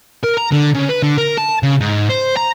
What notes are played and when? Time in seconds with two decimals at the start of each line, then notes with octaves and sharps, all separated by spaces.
0.24 A#4
0.38 A#5
0.52 D3
0.75 C#3
0.89 B4
1.02 D3
1.18 A#4
1.38 A5
1.63 C#3
1.80 G#2
2.09 C5
2.37 A#5